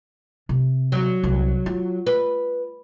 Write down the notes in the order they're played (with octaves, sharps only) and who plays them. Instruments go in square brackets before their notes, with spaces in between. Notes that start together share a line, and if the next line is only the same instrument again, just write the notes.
[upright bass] C3
[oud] F#3
[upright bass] C2
F4
[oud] B4